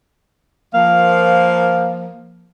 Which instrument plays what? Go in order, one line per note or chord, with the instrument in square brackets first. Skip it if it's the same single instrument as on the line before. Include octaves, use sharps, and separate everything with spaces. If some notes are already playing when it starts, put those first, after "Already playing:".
[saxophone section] F3 A#3 [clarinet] F5